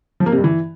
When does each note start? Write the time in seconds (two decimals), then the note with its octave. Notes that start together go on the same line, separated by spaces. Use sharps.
0.20 F3
0.26 A#3
0.32 C3
0.38 G2
0.44 E3